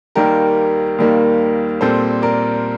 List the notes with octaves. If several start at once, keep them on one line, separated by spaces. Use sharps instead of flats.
D#2 D#3 G3 A#3 G4 A#4
D#2 D#3 G3 A#3
A#2 G3 C4 A4 C5
A#4 D5